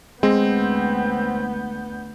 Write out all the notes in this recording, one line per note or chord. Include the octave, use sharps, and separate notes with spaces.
D2 G#3 B3 C4 G6